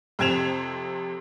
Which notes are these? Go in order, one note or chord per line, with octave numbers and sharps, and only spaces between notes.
F2 C3 C4 G#6 E7 F7